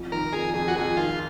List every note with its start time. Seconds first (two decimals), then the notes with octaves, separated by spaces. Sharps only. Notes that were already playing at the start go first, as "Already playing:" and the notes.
Already playing: F2
0.12 D#3 A#4
0.33 F2 G#4
0.54 F2 G#4
0.68 F#4
0.76 F2 G#4
0.97 D#3 F4